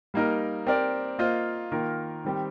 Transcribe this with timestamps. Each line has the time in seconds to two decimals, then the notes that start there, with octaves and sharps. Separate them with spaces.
0.14 G3 A#3 D#4 A#4
0.67 C4 G4 A#4 D5
1.19 A#3 F4 C5 D#5
1.71 D#3 A#3 F4 A#4
2.24 D#3 G3 C4 G4